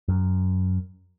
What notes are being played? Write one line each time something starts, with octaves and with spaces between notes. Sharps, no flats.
F#2